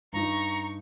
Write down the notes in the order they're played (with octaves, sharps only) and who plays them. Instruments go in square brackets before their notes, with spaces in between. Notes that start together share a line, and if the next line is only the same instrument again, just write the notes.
[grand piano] G2 D#4 [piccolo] A#5 [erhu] C#6